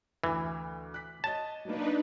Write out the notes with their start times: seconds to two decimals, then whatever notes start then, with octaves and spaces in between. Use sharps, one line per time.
0.24 D2 E3 D6
0.94 F#6 B6
1.24 C#5 D#5 A5
1.65 F#3 A#3 D4 D#4 B4